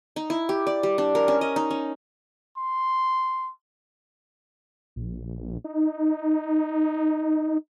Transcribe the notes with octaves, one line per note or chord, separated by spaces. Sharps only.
D#4
E4
G4
D5
G3
D4
A#4
C#4
D#5
D#4
C#4
C6
A#1
D#4